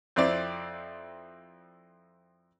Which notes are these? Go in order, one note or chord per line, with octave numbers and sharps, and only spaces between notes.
F2 C4 E4 D5